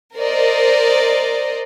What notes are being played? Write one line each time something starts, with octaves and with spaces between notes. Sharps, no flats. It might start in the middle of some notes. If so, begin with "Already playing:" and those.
A#4 C5 D5 D#5